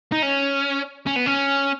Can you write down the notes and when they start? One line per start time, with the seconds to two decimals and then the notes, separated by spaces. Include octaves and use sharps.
0.12 D#4
0.23 C#4
1.07 C#4
1.16 B3
1.26 C#4